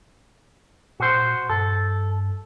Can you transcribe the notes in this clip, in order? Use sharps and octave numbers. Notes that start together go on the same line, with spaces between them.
A#2 F#4 C5
G2 A4